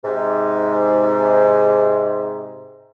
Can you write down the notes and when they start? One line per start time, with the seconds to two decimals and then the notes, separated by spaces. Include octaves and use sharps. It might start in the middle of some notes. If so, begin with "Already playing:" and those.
0.04 G#2 C3